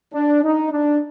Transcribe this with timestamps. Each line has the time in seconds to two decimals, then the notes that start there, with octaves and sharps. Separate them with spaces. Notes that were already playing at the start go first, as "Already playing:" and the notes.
0.13 D4
0.43 D#4
0.72 D4